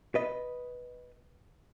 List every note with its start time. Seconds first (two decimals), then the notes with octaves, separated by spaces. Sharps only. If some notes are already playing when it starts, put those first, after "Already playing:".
0.15 B4 D#5